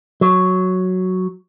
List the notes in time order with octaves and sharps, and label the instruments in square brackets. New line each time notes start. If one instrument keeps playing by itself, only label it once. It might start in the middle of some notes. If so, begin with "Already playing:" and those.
[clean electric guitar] F#3